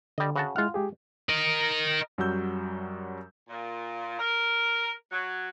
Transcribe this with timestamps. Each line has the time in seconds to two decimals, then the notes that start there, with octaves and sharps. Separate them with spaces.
0.18 D3 G3 D#5
0.36 C#3 F#4 A5
0.56 G#3 E4 F4 F#5 F6
0.74 G#3 G4 G#4
1.29 A#4 D#5
2.18 F#2 F#3 G3 F#4 E6 G6
3.49 A#2
4.19 A#4
5.12 F#3